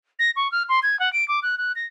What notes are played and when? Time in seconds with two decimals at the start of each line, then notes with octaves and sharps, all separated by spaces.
0.19 A#6
0.36 C#6
0.52 F6
0.69 C6
0.83 G#6
1.00 F#5
1.13 D7
1.28 D6
1.43 F#6
1.58 F#6
1.76 A#6